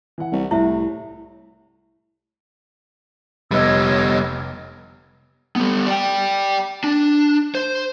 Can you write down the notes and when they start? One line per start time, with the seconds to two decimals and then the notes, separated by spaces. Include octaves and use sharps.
0.18 E3 F#5
0.32 C2
0.51 C2 A2 E4 E5
3.51 F1 G3 B3 C#5 D#5 E6
5.56 G3 B3
5.87 D5 G5
6.84 D4
7.55 C5